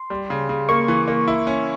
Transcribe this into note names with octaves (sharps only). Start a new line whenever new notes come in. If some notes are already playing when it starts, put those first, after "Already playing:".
Already playing: C6
G3
C#3
C#3
A#3 C#6
E3
A#3
E4
C#4